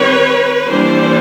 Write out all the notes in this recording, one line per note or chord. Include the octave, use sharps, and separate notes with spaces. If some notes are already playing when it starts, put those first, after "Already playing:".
Already playing: D#3 G3 C4 B4 C#5
E3 G3 A#3 D4 C5 D5